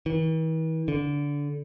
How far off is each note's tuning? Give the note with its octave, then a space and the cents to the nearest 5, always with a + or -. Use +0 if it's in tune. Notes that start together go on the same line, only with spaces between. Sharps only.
E3 -45
D3 -20